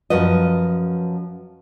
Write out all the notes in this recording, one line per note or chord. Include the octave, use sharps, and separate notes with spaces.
F#2 F3 F#4 B4 D#5